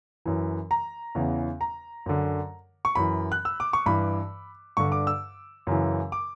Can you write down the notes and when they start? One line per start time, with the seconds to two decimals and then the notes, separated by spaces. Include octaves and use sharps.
0.26 F#2 E3
0.71 A#5
1.15 E2 C#3 E3
1.61 A#5
2.06 F#2 D3
2.85 C#6
2.95 F#2 E3 B5
3.32 F#6
3.45 E6
3.60 D6
3.73 C#6
3.86 G2 E3 B5
4.77 G2 D3 C#6
4.92 D6
5.07 E6
5.67 F#2 C#3 E3
6.12 D6